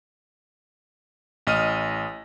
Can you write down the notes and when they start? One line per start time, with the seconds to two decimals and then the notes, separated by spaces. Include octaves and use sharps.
1.47 A1 D#5 F6 D#7